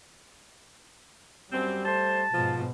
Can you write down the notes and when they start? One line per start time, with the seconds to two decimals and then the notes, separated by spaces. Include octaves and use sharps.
1.51 F#2 G3 C4
1.85 A3 C5 A5
2.33 G#2 B2 F3